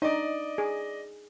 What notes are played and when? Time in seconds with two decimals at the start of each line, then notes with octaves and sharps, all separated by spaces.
0.02 D4 D#4 D5 D#5
0.58 G#4